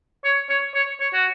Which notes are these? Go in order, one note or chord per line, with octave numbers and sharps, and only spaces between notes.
C#5
C#5
C#5
C#5
F#4